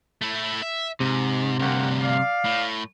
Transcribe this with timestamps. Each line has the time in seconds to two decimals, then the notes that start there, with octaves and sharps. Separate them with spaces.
0.22 A3 E4
0.63 E5
1.00 G#2 C3
1.59 D2 G2 A#3 C4 F#5
2.00 D5 F5
2.45 A2